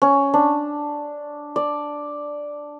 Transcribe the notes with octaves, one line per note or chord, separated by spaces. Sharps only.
C#4
D4
D5